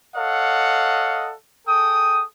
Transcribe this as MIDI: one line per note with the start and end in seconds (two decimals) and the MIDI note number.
0.16 1.33 69
0.16 1.33 73
0.16 1.33 75
0.16 1.33 77
0.16 1.33 78
1.68 2.24 68
1.68 2.24 69
1.68 2.24 79
1.68 2.24 87